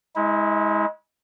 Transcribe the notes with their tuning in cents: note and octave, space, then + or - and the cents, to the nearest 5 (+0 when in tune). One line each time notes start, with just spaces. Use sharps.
G#3 +5 E4 -35